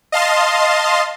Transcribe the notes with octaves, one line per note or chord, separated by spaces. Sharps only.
D#5 F5 A5 C6